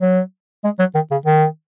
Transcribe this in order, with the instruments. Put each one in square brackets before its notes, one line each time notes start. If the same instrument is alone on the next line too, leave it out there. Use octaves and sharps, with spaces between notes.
[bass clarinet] F#3
G#3
F#3
D#3
C#3
D#3